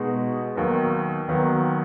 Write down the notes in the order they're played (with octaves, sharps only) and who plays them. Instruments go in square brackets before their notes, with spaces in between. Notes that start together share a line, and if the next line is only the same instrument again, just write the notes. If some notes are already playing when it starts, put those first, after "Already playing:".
Already playing: [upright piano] B2 G#3 D#4 F#4
D#2 D#3 F#3 B3
D#2 D#3 F#3 B3